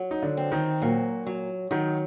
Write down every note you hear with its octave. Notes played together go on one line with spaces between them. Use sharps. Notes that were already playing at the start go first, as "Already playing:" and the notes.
Already playing: F#3
D#4
D3 D4
C4
D#3 D#4
A#2 F#3 F#4
F#3
D#3 F#3 D#4